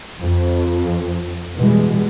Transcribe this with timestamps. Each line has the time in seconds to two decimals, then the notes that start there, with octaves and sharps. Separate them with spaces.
0.22 F2
1.57 B2 E3 G3 G#3